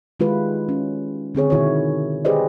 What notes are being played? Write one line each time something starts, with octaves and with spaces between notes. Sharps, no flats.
D#3 G#3 E4 F4 G4 B4
C#4
D3 C4 G#4 C#5
B2 D#3 E4 F#4 C#5
G4 G#4 B4 C5 D5 D#5